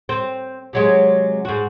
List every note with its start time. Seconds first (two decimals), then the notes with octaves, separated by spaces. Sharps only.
0.09 C4
0.73 C3 F#3 G#3
1.45 G#2 F#4